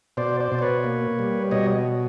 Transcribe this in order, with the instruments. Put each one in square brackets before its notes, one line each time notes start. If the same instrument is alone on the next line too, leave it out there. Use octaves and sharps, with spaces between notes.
[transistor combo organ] B2 C5 D5
C5 D5
B2
D5
B4 C#5
A#3
G3
B2 C#5 D#5